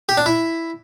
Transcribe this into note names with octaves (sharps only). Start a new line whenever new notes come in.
G4
D4
E4